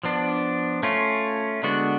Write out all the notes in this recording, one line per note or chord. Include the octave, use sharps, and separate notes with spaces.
F3 B3 D4
A3 C#4 F4
D3 G#3 B3 D4 F#4